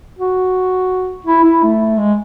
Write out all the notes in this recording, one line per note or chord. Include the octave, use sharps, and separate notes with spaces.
F#4
E4
E4
A3
G#3